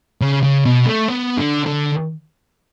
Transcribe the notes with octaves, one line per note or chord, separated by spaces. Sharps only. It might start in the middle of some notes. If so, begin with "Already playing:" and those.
C#3
C#3
B2
A3
B3
D3
D3